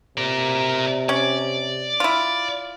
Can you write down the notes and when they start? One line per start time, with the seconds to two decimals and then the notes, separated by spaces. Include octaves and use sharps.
0.18 C3 A#4 D5
1.09 C#4 D5
2.00 E4 F4